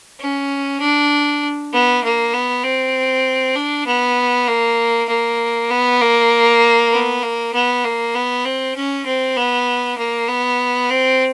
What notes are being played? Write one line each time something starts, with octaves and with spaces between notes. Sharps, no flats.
C#4
D4
B3
A#3
B3
C4
D4
B3
A#3
A#3
B3
A#3
B3
A#3
B3
A#3
B3
C4
C#4
C4
B3
A#3
B3
C4